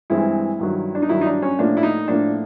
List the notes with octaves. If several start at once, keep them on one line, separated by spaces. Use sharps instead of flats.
G2 E3 G#3 C4 E4
G2 D#3 F#3
D4
D#4
G2 D#3 F#3 E4
D#4
D4
C#4
A2 F3 A#3 D4
E4
D#4
A2 F3 A#3 D4